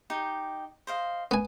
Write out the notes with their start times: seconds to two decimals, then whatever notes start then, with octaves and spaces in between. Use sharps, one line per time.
0.10 D#4 G4
0.87 C5 D#5 F5
1.31 B3 G#5